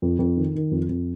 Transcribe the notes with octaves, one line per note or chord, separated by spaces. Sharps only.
F2
F2
D#3
D#3
F2
F2